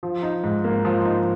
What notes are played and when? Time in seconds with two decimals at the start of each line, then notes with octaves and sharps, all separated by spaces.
0.03 F3
0.23 D#4
0.44 G#2
0.64 A#3
0.85 F3
1.05 D#4